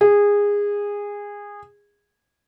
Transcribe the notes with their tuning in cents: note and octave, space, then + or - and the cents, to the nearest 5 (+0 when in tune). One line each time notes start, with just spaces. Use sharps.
G#4 -20